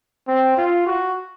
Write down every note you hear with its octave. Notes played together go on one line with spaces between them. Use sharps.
C4
F4
F#4